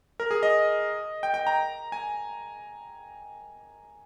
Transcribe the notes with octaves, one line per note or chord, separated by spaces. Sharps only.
A#4
G#4
D#5
G5
G5
A#5
G#5